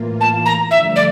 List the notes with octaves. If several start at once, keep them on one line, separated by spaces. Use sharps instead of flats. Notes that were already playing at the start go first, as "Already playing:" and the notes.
Already playing: A2 E3 A#3 F4
A5
A#5
G2 D3 F3 A3 D4 E5
D5